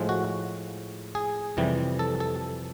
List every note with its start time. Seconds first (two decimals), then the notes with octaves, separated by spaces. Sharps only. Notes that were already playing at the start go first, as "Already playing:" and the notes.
Already playing: A2 F3 G#3
0.09 F#4
1.15 G#4
1.57 F2 C3 E3 G3
1.99 A4
2.20 A4